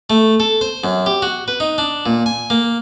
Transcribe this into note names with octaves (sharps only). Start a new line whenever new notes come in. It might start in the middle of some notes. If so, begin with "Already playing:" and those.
A3
A4
C5
F#2
G4
F#4
B4
D#4
D4
A#2
G#5
A#3